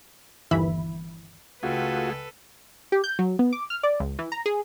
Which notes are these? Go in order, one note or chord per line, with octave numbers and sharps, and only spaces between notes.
G1 D#2 E3 E5 B5
C#2 A3 F4 F#4 G#4 A4 B4 G5
G4
G6
F#3
B3
D6
F6
D5
C#2
E3
A#5
G#4